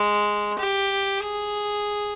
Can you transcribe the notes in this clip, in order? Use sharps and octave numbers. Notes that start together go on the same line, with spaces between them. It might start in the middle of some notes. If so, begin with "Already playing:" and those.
Already playing: G#3
G4
G#4